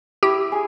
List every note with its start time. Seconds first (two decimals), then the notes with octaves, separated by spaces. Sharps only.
0.23 E4 G4
0.52 G#4